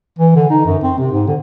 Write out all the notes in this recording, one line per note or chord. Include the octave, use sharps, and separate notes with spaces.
E3
D3
D#4
F#2
C4
C3
G#2
D3